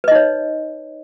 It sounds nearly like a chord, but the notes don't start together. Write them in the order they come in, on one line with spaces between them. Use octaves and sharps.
B4 D#5 D#4 C#5